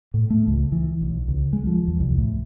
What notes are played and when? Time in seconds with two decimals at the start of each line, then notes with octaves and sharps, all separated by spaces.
0.14 A2
0.30 A3
0.47 C#2
0.72 E3
1.02 B1
1.28 C#2
1.53 G#3
1.67 F3
1.87 E2
2.00 C2
2.18 A2